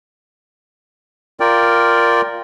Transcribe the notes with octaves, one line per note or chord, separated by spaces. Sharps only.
F4 A#4 D5 G5